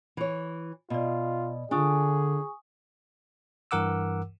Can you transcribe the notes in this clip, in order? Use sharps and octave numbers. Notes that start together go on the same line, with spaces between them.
E3 C#5
B2 F4 D5 D#5
D3 D4 F4 G#4 G#5 C#6 D#6
G2 E3 A#4 F#5 D6 E6